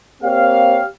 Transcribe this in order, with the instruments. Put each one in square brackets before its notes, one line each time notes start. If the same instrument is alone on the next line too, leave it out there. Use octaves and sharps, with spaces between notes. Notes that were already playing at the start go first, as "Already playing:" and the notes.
[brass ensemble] A#3 C4 G4 C#5 F5